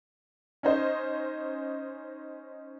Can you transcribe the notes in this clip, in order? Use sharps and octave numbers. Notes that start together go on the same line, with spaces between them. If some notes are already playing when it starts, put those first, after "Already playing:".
C#4 D#4 C5 D#5